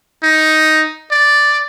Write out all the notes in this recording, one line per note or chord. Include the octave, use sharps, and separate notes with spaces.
D#4
D5